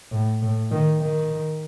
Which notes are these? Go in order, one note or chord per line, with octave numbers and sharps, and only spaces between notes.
A2
A2
D#3
D#3